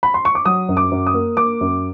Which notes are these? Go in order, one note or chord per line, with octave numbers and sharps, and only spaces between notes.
B5
C6
C#6
D6
F#3 D#6
F#2
D6
F#2
D#6
A#3
A#3 D6
F#2